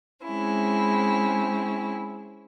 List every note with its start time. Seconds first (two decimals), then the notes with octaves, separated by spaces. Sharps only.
0.23 G#3 C4 C#4 E4